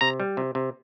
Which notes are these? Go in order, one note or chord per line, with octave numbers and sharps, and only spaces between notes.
C3 A#5
G3
C3
C3